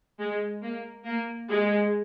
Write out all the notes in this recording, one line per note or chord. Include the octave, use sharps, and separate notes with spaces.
G#3
A#3
A#3
G#3